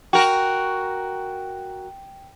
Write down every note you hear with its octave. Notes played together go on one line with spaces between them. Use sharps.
F#4 A#4 G5